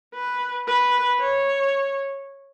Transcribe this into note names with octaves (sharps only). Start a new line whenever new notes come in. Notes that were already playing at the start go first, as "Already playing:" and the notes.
B4
B4
C#5